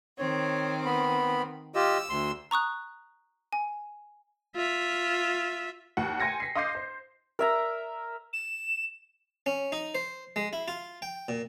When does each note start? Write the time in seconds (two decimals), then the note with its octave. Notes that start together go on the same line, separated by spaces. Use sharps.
0.18 D#3 C4 C#5
0.85 B3 B5
1.75 F4 G4 D#5 E6
2.09 D2 C6
2.51 A#5 C#6 D#6 F#6
3.53 G#5
4.56 F4 E5
5.97 D#2 F#5
6.20 G5 G#5 C6 G#6 A#6 C#7
6.40 B6 C7
6.55 D#5 F5 C6 D6 G6 C7
6.75 C5
7.39 A#4 E5 A#5
8.33 E7
9.46 C#4
9.72 D#4
9.95 C5
10.36 G#3
10.53 E4
10.68 F4
11.02 G5
11.28 A#2